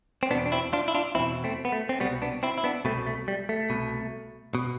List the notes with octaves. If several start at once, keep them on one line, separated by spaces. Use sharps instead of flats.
C4
E2 B2 B3 D4
D4
C4 E4
D4 F4
E4
D4 F4
E2 B2 C4 E4
A3 C4
B3
A3
C4
C2 B2 G3 B3
B3 D4
C4 E4
E4
B3 D4
C2 B2 A3 C4
A3
G3
A3
C2 B2
B2